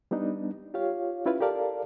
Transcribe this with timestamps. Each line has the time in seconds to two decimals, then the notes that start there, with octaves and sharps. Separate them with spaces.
0.11 G3 B3 D4 D#4
0.74 F4 G4 C#5 F5
1.26 C#4 E4 F4 B4 F5
1.40 G4 A4 A#4 D5 F5 A5